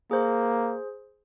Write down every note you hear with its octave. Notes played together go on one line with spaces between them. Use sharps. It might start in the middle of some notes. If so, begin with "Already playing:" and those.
A#3 G#4 C5